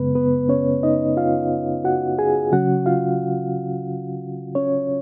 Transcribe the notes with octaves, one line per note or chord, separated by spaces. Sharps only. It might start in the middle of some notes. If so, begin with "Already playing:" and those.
Already playing: F#2 C#3 G#3 B3 B4
B3 B4
C#4 C#5
D#4 D#5
F4 F5
F#4 F#5
G#4 G#5
C#3 F#3 C#4 F#4 F#5
F4 F5
C#4 C#5